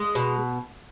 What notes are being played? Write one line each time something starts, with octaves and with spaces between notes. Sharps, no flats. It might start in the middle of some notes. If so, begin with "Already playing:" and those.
Already playing: G#3
B2